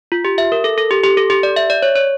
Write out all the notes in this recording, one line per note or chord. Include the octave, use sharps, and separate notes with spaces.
F4
G4
E5
A#4
A4
A4
G4
G4
A4
G4
D5
E5
D5
C#5
C#5